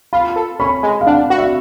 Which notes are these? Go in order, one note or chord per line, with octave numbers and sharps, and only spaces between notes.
F4 B5
A4
C#4 B5
G#3
F5
D4 F#5
F#4
E5